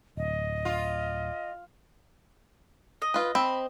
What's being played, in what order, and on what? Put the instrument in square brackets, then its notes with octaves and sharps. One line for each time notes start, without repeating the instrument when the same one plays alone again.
[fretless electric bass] D1 [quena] D#5
[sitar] F4
[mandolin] D#5
[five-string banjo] F4 B4
[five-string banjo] C4 [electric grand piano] B5